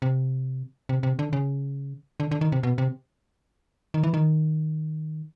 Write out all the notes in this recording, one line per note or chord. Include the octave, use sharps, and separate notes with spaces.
C3
C3
C3
D3
C#3
D3
D3
D#3
C3
B2
C3
D#3
E3
D#3